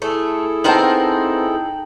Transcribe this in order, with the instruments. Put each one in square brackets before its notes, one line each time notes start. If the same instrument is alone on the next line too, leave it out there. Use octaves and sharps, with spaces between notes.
[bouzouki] A3 [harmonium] E4 G#4 A4
[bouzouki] B3 C4 A#4 [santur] D#4 G5 [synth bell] A5 G6 F#7